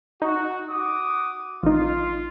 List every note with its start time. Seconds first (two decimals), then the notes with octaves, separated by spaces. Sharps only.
0.22 D#4 F#4
0.68 F#4 D6 D#6
1.63 A1 D#4 F4